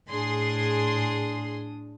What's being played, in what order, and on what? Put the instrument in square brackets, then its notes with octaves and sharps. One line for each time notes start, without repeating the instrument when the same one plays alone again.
[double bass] A2 [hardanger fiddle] D4 D#6 [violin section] G#4 C6